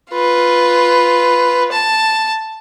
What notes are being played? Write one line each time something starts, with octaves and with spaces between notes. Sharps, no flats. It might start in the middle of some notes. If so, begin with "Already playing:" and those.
F4 B4
A5